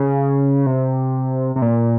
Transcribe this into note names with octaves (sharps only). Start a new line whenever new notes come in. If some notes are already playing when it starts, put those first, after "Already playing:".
Already playing: C#3
C3
C3
A#2